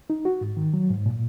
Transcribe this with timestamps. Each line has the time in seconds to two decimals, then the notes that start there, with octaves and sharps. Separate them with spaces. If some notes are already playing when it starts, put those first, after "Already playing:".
0.10 D#4
0.25 F#4
0.41 G#2
0.57 D#3
0.74 F#3
0.90 G#2
1.06 A#2